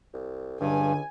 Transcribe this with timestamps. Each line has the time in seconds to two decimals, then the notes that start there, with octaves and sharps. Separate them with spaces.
0.14 C2
0.61 C#2 G2 D3 G#5